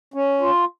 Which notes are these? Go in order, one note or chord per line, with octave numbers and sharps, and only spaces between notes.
C#4
F4